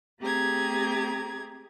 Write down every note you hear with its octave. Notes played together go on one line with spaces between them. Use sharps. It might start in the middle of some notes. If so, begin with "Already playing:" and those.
A3 C4 G4 G#4 A#5 G#6